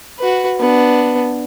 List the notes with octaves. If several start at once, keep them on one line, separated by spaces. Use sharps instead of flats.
F#4 B4
B3 D4